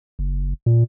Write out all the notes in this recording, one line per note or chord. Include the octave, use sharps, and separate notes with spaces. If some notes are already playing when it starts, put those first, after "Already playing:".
F#1
A#2